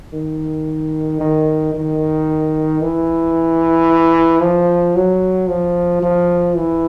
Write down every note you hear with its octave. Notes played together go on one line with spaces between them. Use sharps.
D#3
D#3
D#3
E3
F3
F#3
F3
F3
E3